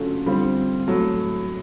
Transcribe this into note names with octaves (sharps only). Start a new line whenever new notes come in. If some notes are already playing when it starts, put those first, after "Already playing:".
Already playing: D3 F#3 A3 C#4 F4
D3 G3 C4 F4
A2 F#3 A3